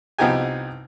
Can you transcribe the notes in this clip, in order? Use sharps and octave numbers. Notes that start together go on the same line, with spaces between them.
C2 F3 B3 D#4 G4 G#5